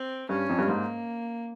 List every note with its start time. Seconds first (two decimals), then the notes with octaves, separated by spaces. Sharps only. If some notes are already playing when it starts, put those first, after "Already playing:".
Already playing: C4
0.29 G2 C#4
0.49 F2
0.58 G2
0.68 G#2 A#3